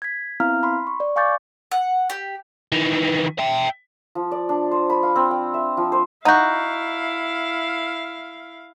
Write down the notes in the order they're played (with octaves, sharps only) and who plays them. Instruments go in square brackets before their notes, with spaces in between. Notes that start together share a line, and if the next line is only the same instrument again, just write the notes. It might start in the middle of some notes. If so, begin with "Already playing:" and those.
[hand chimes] G#6 B6
B3 C4 E4 F5 A#5 F6
B5 C6
C#6
D5
F5 G#5 C#6 D6 G6 A6
[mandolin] F#5
G4
[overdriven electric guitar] D#3 E3
E5 G5
[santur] F3
D5
D4
C5
B5
F5
C4
G5
E5
F3
C5
[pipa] D#4 F#4 [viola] E4 F5 [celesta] F#5 A#5 G6